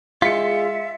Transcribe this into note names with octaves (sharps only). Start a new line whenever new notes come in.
G#3 F4 E5 B6 C#7